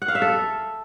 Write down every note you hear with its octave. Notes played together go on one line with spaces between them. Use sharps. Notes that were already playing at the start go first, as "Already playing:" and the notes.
F#5
F5
E5
A4